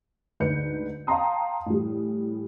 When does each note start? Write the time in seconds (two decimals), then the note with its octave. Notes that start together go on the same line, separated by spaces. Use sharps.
0.40 D2 G#2 B4 G6 C#7
1.07 F5 G5 A5 A#5 C6 D#6
1.66 A2 E3 G3